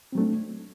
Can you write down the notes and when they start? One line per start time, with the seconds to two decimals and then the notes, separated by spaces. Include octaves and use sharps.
0.12 C4
0.15 F#3
0.18 A3
0.20 D4